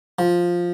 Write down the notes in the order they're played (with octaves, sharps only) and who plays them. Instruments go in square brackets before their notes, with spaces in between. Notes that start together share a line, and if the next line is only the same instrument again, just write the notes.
[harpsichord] F3